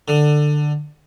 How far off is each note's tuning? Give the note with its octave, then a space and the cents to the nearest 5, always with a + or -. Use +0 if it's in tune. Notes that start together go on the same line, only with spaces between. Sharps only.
D3 +15